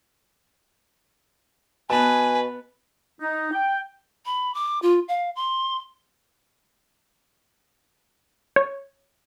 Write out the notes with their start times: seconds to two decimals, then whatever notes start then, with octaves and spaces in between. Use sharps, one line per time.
1.90 B2 B3 B4 G#5 A5
3.20 D#4
3.53 G5
4.26 B5
4.55 D6
4.82 F4
5.08 F5
5.36 C6
8.56 C#5